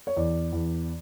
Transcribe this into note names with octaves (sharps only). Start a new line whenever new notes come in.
C#5
E2 D5
E2